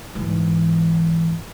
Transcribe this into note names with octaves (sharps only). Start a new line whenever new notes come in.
G#2 E3